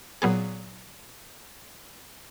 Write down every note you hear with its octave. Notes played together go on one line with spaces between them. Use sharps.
A#2 F#3 B3 G#4